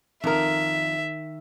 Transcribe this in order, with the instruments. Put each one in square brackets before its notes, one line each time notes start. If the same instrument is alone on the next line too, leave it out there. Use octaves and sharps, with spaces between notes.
[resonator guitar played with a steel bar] F2 A#4 [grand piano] D#3 [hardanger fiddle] E5